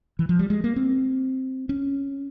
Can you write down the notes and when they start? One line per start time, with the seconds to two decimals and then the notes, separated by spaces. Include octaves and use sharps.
0.19 E3
0.29 F3
0.39 G3
0.50 G#3
0.64 A#3
0.76 C4
1.69 C#4